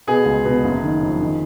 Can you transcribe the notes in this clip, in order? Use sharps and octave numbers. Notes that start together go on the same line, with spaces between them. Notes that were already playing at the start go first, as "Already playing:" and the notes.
B2 G#4
C#2
B2
F#1
D#3
F2
D#3